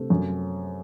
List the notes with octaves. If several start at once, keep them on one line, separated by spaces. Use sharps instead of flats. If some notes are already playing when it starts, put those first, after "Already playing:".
Already playing: C3 A3
F#2